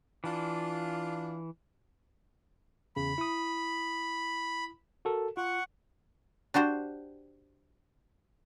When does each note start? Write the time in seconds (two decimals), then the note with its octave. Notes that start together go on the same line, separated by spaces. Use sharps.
0.24 E3 D4 F4
2.96 E2 C#3 B5
3.18 E4 D#6
5.05 F#4 A4 A#4
5.37 F4 F#5 C#6
6.54 D4 F#4 G4 C5